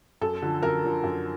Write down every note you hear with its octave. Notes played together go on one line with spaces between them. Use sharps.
F#2 A4
D3 F3
F#2 A#4
D3 F3
F#2